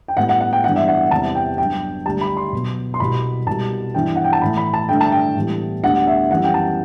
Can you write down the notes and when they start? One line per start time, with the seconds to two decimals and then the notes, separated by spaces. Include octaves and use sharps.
0.08 G5
0.17 A2 G3 B3 F#5
0.29 F#5
0.41 F#5
0.53 G5
0.64 G2 E3 G3 B3 F#5
0.76 E5
0.88 F#5
1.11 E2 C3 G3 B3 A5
1.35 G5
1.58 G2 F#3 B3 G5
2.06 D2 D3 G3 A5
2.21 B5
2.37 C6
2.52 B2 F#3 B3
2.94 C6
3.00 C2 B2 G3 B3 B5
3.47 C2 B2 G3 B3 A5
3.94 G2 E3 B3 G5
4.15 F#5
4.24 G5
4.33 A5
4.42 A2 E3 A3 B5
4.57 B5
4.74 A5
4.89 G2 D3 A3 G5
5.01 A5
5.12 G5
5.36 A2 E3 G3 B3
5.83 D2 D3 G3 B3 F#5
6.07 E5
6.30 F#2 E3 G3 B3 F#5
6.44 G5
6.54 A5